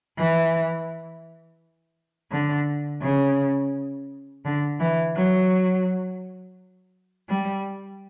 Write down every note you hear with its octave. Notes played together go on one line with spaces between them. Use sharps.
E3
D3
C#3
D3
E3
F#3
G3